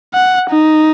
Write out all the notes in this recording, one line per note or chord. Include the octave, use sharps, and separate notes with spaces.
F#5
D#4